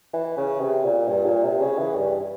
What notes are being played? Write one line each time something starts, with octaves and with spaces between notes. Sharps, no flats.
E3
C#3
C3
A#2
G2
A#2
C3
C#3
E3
G2